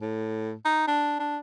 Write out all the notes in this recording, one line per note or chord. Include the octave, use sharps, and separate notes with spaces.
A2
D#4
D4
D4